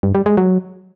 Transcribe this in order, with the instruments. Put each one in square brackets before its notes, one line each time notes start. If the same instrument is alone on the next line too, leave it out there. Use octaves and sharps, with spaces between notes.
[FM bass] G2
G3
G#3
F#3